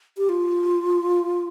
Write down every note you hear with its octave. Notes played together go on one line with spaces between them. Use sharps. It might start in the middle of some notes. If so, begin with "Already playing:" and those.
G4
F4